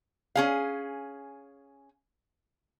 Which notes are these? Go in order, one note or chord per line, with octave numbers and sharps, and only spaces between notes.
C#4 G#4 F5